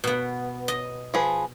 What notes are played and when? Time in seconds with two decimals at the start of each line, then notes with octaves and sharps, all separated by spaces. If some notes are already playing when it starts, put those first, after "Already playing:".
0.04 B2 B3
0.68 D#5
1.14 F3 G#4 B4